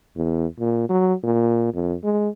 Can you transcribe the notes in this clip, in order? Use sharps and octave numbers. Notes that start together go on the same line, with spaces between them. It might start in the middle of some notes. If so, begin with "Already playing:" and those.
E2
A#2
F#3
A#2
F2
G#3